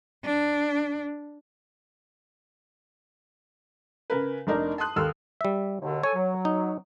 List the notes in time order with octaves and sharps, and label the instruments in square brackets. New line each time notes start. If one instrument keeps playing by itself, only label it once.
[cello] D4
[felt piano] C#3 A#4 B4
F1 D4 D#4 A#4 D5
A5 C6 D#6 F#6
D#2 A4 C6 E6 F6
[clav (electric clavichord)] G3 E5
[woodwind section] D#2 B2 D3
[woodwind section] A4 G#5 [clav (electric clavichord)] C#5
[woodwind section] F#3
[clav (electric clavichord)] D#4